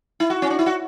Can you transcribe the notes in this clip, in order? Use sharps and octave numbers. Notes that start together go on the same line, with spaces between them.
E4
F#4
C#4
D4
E4
F#4